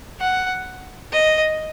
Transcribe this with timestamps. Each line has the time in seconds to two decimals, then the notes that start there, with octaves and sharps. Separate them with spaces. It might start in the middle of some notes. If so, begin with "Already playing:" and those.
0.20 F#5
1.12 D#5